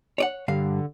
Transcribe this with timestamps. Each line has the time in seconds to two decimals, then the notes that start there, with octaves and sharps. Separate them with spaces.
0.18 C#5 D5 F#5
0.48 G2 D3 F5